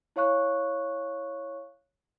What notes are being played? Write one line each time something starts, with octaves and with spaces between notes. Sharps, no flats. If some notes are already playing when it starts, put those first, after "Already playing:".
E4 C#5 F5 C#6 F#6